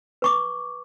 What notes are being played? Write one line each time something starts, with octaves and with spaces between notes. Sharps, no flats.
B4 C#6 D6